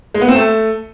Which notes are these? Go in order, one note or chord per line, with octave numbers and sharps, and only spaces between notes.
G#3
B3
C4
A3